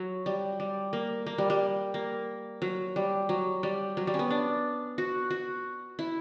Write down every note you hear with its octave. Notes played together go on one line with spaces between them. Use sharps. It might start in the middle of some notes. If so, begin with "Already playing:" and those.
Already playing: F#3
G3
G3
A#3
A#3
G3
G3
A#3
F#3
G3
F#3
G3
F#3
G3
C#4
B3
D4
F#4
F#4
E4